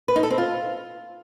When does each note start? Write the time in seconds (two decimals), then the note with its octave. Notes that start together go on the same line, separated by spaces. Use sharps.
0.08 B4
0.16 D#4
0.23 A4
0.30 C4
0.38 F4